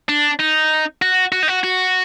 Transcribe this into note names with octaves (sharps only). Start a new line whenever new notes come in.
D4
D#4
F#4
F#4
D#4
F#4
F#4